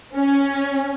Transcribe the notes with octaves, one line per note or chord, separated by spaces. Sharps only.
C#4